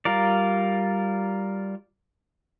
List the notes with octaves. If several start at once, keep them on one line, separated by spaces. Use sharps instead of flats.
G3 F4 A#4 D5